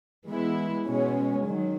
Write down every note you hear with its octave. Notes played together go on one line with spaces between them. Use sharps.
E3 G#3 B3 E4
B2 G#3 C#4
D#3 F#3